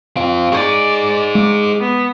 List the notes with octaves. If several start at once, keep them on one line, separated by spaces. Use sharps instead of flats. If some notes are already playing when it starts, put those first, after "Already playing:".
C4 F4 F5
D#4 G#4 D5 C#6
G#3 D6
B3